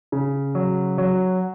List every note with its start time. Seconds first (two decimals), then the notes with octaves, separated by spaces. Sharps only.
0.12 C#3
0.55 F#3
0.98 F#3